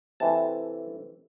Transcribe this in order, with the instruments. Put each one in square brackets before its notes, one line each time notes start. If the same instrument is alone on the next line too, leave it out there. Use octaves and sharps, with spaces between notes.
[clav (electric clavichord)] C3 E3 A3 A5